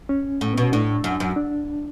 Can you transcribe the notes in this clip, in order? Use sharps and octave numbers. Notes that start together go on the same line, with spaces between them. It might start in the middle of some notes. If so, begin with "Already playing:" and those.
C#4
A2
B2 B3
C#4
A2 D4
F#2
F#2
D4